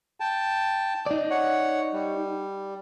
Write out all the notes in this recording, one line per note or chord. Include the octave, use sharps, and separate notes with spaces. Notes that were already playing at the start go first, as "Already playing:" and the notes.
G5 A5
D#4 D5
C#5 F#5
G3